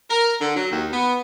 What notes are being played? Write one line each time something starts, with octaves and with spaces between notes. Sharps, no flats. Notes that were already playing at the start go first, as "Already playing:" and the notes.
A#4
D3
F#3
D#2
B3